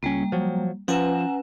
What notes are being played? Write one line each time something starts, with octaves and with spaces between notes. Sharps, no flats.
C#2 G3 A#3 C#4
F3 F#3
F3 C#4 B4 F#5 G#5 A#5 E7